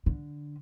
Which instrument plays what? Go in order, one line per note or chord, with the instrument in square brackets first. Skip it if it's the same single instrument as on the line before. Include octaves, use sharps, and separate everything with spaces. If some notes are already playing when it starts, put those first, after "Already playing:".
[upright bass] D3